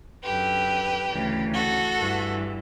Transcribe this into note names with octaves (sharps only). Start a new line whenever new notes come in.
F#2 D3 G4 B4
D2 C#3 E3
F#4 A4
G2 E3